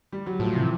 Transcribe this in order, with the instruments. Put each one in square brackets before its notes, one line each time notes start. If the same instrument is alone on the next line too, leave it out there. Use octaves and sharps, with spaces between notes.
[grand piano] G3
F#3
[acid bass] A2 [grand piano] F3
[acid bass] C3 [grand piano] E3